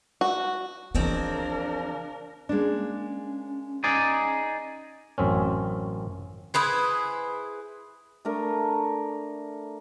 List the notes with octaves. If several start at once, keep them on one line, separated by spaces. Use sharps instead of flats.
F#4
F2 C#3 E3 C4 D4 A#4
G#3 A#3 C#4 D4
D#4 G#4 D5
A1 F#2 C4 C#4
E4 G#4 B4 C5
A3 D4 A#4